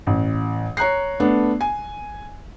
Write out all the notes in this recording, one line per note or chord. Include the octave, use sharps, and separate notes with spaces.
A1
C#5 A#5 F#6 C7
A3 B3 D4
G#5